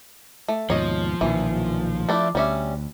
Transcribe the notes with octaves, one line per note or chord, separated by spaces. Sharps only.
A3
D#2 G#2 B2 F3 C#5 D#5
B1 A#2 D#3 E3
A3 D4 E4
D2 G3 C#4 E5